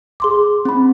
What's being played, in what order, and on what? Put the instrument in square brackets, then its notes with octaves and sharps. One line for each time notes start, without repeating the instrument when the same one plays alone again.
[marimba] G#4 C6 D6
[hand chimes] C4 B5